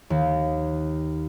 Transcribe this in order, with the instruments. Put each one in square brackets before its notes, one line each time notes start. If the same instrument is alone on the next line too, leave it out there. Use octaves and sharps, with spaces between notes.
[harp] D#2